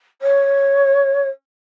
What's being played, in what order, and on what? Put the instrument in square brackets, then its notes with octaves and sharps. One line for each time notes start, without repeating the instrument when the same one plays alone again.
[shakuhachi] C#5